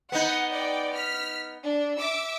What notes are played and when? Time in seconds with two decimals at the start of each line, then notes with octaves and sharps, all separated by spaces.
0.12 B3 D#4 F#5
0.51 D5 G5
0.93 F6 B6
1.63 D4
1.98 E5 D6 E6